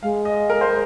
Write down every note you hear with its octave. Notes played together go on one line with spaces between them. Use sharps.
G#3 F5
D#5
A#4
C5